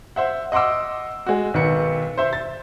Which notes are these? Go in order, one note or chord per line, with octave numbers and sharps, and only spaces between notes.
C5 E5 F#5
D#5 F#5 C6 D6 E6
G#3 F#4
B1 D#3 B4 C#7
C5 E5 C6
A6